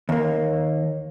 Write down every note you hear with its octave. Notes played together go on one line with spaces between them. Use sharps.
D#2 A#3